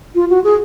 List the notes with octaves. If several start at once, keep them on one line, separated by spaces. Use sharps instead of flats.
F4
F#4
G#4